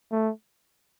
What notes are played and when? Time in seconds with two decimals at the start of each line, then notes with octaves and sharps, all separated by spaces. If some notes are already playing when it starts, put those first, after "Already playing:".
0.11 A3